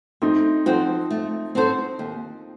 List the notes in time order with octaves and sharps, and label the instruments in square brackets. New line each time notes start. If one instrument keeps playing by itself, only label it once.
[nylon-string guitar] A3 [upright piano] C4 D#4
[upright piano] F3 [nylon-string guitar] C4 F#4 A4 C5
[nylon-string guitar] A3
C4 F#4 A4 C5
D#2